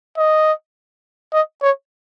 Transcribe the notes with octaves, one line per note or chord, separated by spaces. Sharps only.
D#5
D#5
C#5